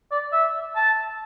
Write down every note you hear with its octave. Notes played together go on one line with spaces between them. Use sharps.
D5
E5
A5